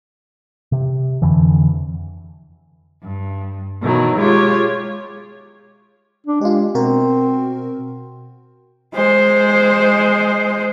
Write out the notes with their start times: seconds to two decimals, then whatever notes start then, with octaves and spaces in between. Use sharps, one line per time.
0.72 C3
1.22 F2 D3 E3
3.02 G2
3.82 B2 D#3 E3 F#3
4.19 G#3 F4 G4 C#5
6.27 D4
6.41 G#3 F4 G4
6.75 B2 C4 F#4 A#4
8.94 G#3 C5